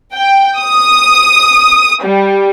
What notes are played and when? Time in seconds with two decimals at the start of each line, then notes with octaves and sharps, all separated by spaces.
0.14 G5
0.58 D#6
2.03 G3